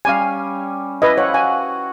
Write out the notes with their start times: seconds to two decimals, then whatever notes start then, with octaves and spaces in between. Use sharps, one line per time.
0.05 G3 C#4 F5 G#5
1.02 E4 B4 D#5
1.18 F3 C#5 F#5
1.34 F#4 G#5